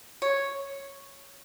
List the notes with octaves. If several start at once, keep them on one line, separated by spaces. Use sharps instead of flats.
C#5